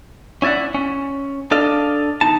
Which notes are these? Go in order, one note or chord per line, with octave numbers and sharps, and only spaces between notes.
C#4 E4 D5 E5 F#5
C#4
D4 A4 D5 D#5 F5
E2 D#4 A5